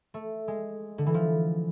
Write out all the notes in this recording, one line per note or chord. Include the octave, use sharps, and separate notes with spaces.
A3
G#3
D3
E3
F3